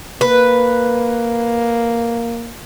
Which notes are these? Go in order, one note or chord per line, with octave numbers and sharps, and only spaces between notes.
A#3 B4